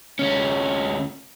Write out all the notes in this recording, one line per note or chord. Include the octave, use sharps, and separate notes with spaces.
D2 C#4